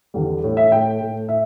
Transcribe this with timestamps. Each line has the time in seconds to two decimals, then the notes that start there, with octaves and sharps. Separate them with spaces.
0.14 E2 D3 G3
0.43 A2 A3
0.57 E5
0.72 A2 A3 G5
1.01 A2 A3
1.28 A2 E5